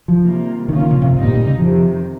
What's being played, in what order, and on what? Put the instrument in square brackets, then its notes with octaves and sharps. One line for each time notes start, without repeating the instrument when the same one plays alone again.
[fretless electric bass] F3
[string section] C3 D#3 G3 A#3 F4
[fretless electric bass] D#3 [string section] F3 A#3 C#4 F4
[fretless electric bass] D#3
C#3
C3
[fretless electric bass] G#2 [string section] D#3 G3 C4 D#4
[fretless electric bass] A#2
A#2
C#3
[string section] F2 C3 D#3 [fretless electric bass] F3